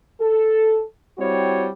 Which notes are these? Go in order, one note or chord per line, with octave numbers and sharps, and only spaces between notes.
A4
G3 C4 E4 F#4 C5 C#5